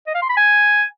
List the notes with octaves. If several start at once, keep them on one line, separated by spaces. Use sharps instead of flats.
D#5
F5
C6
B5
G#5